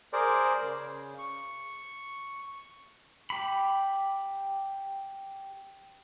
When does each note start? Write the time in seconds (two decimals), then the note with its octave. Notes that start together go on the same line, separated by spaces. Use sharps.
0.13 G#4 A#4 C5 D5
0.63 C#3
1.18 C#6
3.30 G4 B5